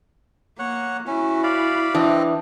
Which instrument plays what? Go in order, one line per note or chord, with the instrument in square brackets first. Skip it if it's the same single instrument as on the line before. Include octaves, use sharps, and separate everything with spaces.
[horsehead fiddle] A#3 [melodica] C#5 F#5
[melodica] C#4 [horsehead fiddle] E4 F#4
[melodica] D5 F5 B5
[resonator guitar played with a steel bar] E3 D4 [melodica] C4 D#5